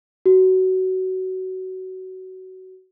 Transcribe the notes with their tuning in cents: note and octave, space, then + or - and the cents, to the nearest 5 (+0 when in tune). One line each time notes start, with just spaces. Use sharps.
F#4 +20